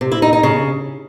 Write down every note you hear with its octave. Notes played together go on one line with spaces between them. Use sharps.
C3
E4
D#4
D#4
C#3